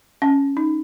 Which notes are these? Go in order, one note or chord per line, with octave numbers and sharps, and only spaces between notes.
C#4
D#4